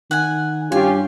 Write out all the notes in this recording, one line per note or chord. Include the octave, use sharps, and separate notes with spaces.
D#3 F#5 G#5
G2 C#4 F4 G4 G#5